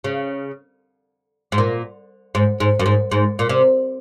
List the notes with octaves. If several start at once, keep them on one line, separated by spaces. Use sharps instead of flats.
C#3
G#2
A#2
G#2
G#2
F#2
G#2
G#2
A#2
C3